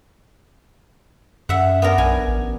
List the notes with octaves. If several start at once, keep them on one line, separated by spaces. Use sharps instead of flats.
F#2 E5 F#5
B3 D4 A#4
B1 G#5
A1